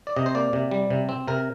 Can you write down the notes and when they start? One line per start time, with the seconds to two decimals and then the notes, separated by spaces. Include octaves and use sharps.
0.07 D5
0.16 C3 D#5
0.26 C5
0.35 A#3 D5
0.53 C3
0.71 G3
0.90 C3
1.09 C4
1.28 C3 A#4